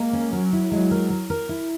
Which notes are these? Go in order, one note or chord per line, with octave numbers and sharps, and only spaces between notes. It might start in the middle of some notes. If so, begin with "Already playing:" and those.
Already playing: G#3 A#3
C#4
F#3 A#4
E4
F#3 G#3
A#4
A#4
A#4
E4